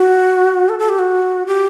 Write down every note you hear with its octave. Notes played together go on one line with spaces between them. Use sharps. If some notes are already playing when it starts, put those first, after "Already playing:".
Already playing: F#4
A4
A4
G4
F#4
G4